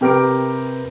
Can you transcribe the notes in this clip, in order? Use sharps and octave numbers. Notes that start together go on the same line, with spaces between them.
C3 G4 A#4 B4 D6 D7